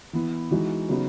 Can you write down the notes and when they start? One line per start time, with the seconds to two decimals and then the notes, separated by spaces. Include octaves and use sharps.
0.13 E3 B3 E4
0.51 E3 G#3 D#4 F#4
0.89 C#3 F#3 B3 D#4 F#4